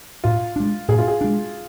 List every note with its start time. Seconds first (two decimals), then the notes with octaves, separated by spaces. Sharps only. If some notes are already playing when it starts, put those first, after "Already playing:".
0.24 A2 F4
0.56 G#3 D4
0.88 A2 G#4
0.98 F4
1.08 G#4
1.21 G#3 D4